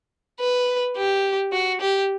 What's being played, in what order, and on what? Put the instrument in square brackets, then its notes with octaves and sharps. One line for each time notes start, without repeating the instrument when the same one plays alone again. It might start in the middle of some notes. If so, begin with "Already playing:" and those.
[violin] B4
G4
F#4
G4